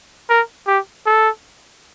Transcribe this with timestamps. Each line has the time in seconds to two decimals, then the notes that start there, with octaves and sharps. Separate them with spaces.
0.30 A#4
0.67 G4
1.06 A4